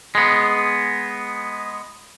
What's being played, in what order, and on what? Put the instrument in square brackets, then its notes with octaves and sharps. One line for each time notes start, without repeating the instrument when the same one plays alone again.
[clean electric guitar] G#3 B3